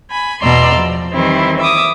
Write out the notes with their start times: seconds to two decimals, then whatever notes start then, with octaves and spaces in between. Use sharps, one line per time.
0.11 G#5 B5
0.42 E2 B2 D5 A#5 C6 E6
0.74 F3
1.12 D#3 E3 G3 C4 E4
1.60 E5 D6 D#6